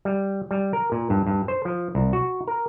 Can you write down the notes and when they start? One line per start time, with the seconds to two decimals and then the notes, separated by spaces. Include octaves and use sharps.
0.05 G3
0.51 G3
0.73 A#4
0.92 A#2
1.10 G2
1.27 G2
1.48 C5
1.65 F3
1.95 C2
2.13 F#4
2.47 A#4